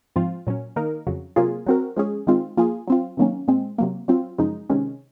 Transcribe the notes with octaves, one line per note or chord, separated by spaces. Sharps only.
G#2 F3 C4 F4
A#2 F#3 C#4
D#3 A#3 D#4 A#4
F2 C#3 F#3
C3 F#3 A#3 F4 G#4
F#3 C4 F#4 A#4
F3 G#3 C#4 G#4
D#3 G#3 C4 F4
F3 A#3 F4 G#4
F#3 C4 F4
C3 D#3 F#3 A#3 C#4
A#2 G#3 C4
C3 F#3 A#3
F#3 C4 F4
F#2 C#3 F3 G#3 D#4
C3 D#3 G#3 C#4